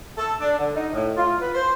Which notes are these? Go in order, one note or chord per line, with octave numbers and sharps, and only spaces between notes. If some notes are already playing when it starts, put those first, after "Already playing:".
A4
D4
D3
D#4
A2
F4
B4
C5